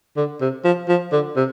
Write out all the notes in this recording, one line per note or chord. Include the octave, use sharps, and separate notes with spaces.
D3
C3
F3
F3
D3
C3